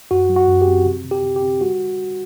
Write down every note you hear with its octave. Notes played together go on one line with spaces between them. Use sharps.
F#2 F#4
F#3
F#4
F#2
G4
C4
C3
C3
G4
C3
G4
C4
G3 F#4